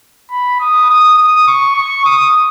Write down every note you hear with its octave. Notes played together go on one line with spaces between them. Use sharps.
B5
D#6
D#6
D#6
C#6
C#6
D#6